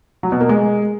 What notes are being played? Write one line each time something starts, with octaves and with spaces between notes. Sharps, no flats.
F#3
B2
A#3
G#3